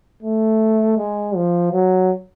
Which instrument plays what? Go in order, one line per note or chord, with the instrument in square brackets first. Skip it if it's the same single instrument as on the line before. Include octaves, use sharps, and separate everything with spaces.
[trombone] A3
G#3
F3
F#3